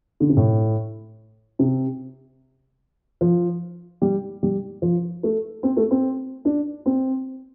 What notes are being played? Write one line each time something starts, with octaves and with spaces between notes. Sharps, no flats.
D3
C3
A2
C3
F3
G3
G3
F3
A3
C4
A3
C4
D4
C4